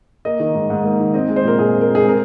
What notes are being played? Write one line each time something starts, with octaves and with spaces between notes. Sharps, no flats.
A#3 D#5
D#3
G#2
G#2
A#3
D#3
C4 D#5
G#3
C5
A#2 A#4
A#2 G#4
C4
A#4
G#3
G#4
C4
A#4